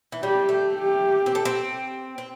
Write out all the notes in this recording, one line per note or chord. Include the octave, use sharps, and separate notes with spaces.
E3
G3 G4
A3
G4
C4
A3
C4
C4